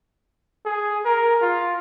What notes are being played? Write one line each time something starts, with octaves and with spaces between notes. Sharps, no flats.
G#4
A#4
F4